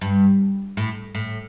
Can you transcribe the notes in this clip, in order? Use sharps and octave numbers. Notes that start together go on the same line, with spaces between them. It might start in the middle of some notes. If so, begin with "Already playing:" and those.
G2
A2
A2